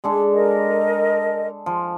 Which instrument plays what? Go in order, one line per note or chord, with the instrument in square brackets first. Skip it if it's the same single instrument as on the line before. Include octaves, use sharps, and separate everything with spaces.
[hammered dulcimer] G#3 D4 A4
[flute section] A#4 D#5
[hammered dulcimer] F3